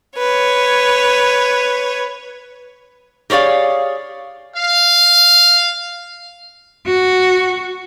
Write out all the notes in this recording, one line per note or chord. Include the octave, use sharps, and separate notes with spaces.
B4 C#5
G4 G#4 C#5 D5 F5
F5
F#4